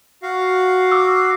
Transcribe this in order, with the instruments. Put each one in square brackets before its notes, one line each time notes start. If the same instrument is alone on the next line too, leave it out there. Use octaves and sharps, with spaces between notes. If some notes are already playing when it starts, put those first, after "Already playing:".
[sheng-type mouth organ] F#4 F5
[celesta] D6 E6